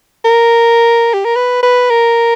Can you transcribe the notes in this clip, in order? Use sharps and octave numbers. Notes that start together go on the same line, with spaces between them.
A#4
G4
A#4
B4
B4
A#4